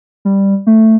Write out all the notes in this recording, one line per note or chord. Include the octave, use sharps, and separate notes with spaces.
G3
A3